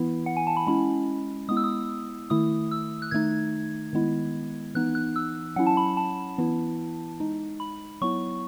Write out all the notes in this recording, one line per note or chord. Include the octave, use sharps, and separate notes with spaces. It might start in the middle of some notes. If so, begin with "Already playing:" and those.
Already playing: E3 B3 E4
F#5
G#5
A5
B5
G#3 C#4 E4 B5
G#3 B3 E4 D#6
E6
D#6
D#3 A3 E4 D#6
E6
F#6
D#3 A3 D#4 G#6
D#3 G#3 B3 E4
E3 B3 D#4 F#6
F#6
E6
F#3 C#4 E4 F#5
A5
B5
A5
E3 B3 E4
G#3 D#4
B5
F#3 B3 E4 C#6